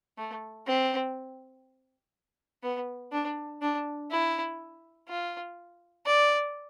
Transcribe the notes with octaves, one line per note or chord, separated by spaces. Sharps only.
A3
C4
B3
D4
D4
E4
F4
D5